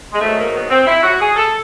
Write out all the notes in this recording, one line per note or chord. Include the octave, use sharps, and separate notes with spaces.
G#3
G#2 D#3 F#3 A3
A#3
B3
C4
E4
F#4
G#4
A4